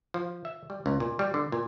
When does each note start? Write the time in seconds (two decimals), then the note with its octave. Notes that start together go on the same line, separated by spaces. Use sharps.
0.14 F3
0.45 E5
0.70 G3
0.86 C#2
1.00 A#2
1.19 G3
1.34 D3
1.52 A#2